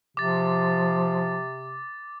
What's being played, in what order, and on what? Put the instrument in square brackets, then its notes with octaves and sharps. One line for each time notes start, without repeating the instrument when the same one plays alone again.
[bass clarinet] C3 [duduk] F3 [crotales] D6 A6